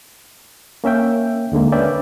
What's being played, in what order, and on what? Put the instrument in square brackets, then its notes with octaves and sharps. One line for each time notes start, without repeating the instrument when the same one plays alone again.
[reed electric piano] A#3 C#4 E5 G5
D#2 D3 G#3 A#3
C#4 D4 B4 D5 E5 G5